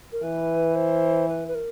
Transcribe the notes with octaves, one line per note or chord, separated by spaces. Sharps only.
A#4
E3 B4
C5
B4
B4
A#4